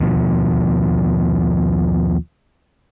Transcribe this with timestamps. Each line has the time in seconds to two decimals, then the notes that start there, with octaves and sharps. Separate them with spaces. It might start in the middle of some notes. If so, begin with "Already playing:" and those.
0.01 D#2 B2 F3